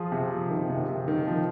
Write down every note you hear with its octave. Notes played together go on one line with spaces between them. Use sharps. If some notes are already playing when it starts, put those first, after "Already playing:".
Already playing: F3 F4 G#4
C3
F3
D#3
C3
C3
D#3
F3